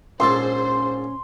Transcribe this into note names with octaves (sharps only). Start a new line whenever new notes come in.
A#1 G#2 C#4 A4 C5 C6